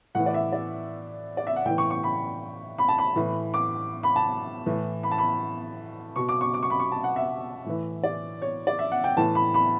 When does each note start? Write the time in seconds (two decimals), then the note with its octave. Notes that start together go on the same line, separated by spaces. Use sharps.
0.15 A2 E3 F#5
0.26 D5
0.34 E5
0.52 D5
1.37 D5
1.47 E5
1.56 F#5
1.66 A2 G5
1.70 E3
1.78 C#6
1.90 C#6
2.03 B5
2.79 B5
2.89 A5
2.98 B5
3.16 A2 E3
3.54 D6
4.03 B5
4.16 A5
4.66 A2 E3
5.03 B5
5.11 A5
5.18 B5
6.16 B2 C#6
6.29 D6
6.41 C#6
6.54 D6
6.63 C#6
6.70 B5
6.80 C#6
6.92 A5
7.04 F#5
7.16 E5
7.66 A2 E3
8.04 D5
8.42 C#5
8.67 D5
8.79 E5
8.92 F#5
9.04 G5
9.17 A2 E3 A5
9.35 B5
9.54 B5